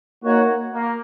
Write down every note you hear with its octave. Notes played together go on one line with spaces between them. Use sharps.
A#3 D#4 F#4 C#5
A#3